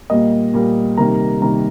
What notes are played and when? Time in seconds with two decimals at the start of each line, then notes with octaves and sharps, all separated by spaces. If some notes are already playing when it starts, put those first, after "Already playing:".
0.10 A#2 G3 A#3 D#5
0.54 A#2 G3 A#3
0.97 C3 D#3 G3 A#3 A#5
1.42 C3 D#3 G3 A#3 A#5